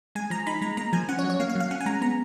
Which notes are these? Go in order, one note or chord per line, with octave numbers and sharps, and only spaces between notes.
G#3 G#5
F3 A#5
D#4 B5
G#3 A#5
A#3 A#5
F3 G#5
C#4 F#5
C#5
F#3
C#5
A#3 F5
F5
F#3
F5
C#4 F#5
G#5
G#3 A#5
B3 A#5